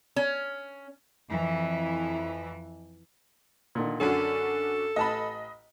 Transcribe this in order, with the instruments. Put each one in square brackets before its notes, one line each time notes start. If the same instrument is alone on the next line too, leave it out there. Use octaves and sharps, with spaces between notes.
[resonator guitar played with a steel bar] C#4
[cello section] F2 E3
[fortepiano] A#2 D3 D#3
[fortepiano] F#2 D3 [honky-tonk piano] C#4 D4 F#4 [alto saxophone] A4
[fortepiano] A1 A5 [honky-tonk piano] D#5 B5